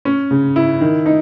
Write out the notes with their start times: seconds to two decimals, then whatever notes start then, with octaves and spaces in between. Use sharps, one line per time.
0.05 C#4
0.31 C#3
0.56 E4
0.81 D#3
1.06 D#4